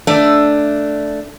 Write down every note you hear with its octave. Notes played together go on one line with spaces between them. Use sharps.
A3 D4